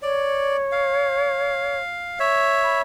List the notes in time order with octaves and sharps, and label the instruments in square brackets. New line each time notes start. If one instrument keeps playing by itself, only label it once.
[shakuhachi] C#5 [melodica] D5
[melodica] F5
C#5 E5
[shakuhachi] B5